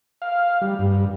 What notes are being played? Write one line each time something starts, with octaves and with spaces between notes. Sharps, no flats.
F5
G3
G2